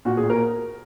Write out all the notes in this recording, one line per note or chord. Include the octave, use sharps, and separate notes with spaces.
A#2 F#4
G#4
A#2
A#4